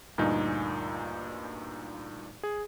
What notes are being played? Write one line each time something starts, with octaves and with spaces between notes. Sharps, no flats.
D2 G2 A#2 D#4 G#5
G#4